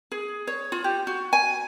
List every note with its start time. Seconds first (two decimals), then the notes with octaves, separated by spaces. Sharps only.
0.12 G#4
0.47 C#5
0.72 F4
0.84 G4
1.07 F#4
1.33 G#5